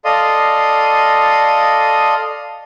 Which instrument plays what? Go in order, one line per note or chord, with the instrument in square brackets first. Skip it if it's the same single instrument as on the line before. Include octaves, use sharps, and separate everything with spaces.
[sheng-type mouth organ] A4 D5 D#5 F5 C6 D#6